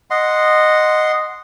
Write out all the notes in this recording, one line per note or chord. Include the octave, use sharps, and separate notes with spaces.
D#5 F#5 C6